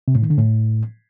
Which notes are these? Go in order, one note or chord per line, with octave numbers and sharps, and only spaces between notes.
C3
A2
D#3
D3
A2